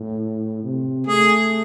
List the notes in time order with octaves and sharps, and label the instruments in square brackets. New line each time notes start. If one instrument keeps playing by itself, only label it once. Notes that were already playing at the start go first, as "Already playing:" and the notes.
Already playing: [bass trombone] A2
C3
[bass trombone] A3 [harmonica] G#4